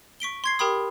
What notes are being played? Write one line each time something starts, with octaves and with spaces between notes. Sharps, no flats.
C#6 B6 D7 G7
C6 G#6 C7
G4 A#4 G5 B5 D#6